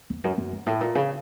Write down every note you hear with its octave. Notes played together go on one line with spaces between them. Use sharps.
E2
F#2
F#2
G2
A2
A#2
C#3